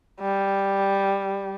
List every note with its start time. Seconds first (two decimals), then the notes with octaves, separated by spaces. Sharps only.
0.21 G3